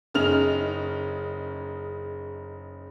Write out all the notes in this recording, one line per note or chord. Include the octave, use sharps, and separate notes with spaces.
F#1 C#3 D#4 F6 F7